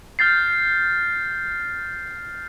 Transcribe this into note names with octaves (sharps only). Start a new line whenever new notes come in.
F6 G6 A6 C7